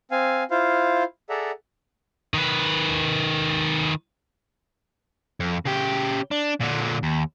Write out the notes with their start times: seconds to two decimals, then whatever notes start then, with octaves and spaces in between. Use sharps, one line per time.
0.11 C4 F5 G#5
0.51 E4 F4 C5 F5
1.30 G#4 A4 D5 E5 F#5 A#5
2.34 D#3 B4
5.40 F2
5.65 C#3 G4
6.31 D4
6.61 A#2 D3
7.03 D#2